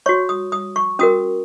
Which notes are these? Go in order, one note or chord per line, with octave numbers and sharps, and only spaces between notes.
F#4 C#5 C#6
D#6
D#6
C#6
C#4 F#4 A#4 D#6